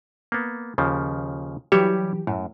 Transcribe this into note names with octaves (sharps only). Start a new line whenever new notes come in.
A#3 B3
D#2 C#3 F3
E3 F#3 G3 G4 C#5 E5
F#2 A2